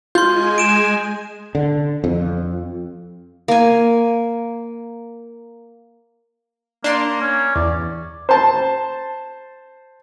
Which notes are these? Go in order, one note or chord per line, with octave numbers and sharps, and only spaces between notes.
G#3 F4 G#5 C6 G6
D7 E7
D3
F2
A#3 G#5
A#3 D4 C6
C#4
E2 D5
C5 A5